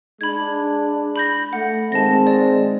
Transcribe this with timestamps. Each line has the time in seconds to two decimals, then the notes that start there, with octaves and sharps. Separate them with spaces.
0.21 G#3 D4 B5 G#6
1.16 B5 G6 A#6
1.53 A3 F#5
1.92 D#3 G#3 C4 A5 A#6
2.27 D5